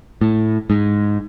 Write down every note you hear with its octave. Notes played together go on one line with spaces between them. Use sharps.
A2
G#2